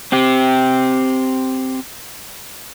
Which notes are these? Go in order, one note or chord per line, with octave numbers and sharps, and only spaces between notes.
C4 G4